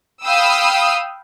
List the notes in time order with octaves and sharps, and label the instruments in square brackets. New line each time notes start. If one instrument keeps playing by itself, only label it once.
[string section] F5 G5 B5 D#6 E6